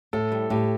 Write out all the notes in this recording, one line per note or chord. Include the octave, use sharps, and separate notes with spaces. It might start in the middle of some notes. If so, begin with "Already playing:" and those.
A2 A4
G3
A2 G4